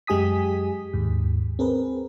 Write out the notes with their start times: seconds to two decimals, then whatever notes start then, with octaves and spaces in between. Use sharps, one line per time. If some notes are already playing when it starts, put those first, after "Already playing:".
0.07 F#2 G#3 G4 G#5 D#6 B6
0.93 D#2 G#2
1.59 C4 G#4 A#4 B4